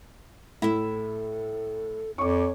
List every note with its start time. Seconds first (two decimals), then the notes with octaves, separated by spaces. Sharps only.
0.62 A2 E4 A4 E5
2.18 F2 C#5 C#6 D6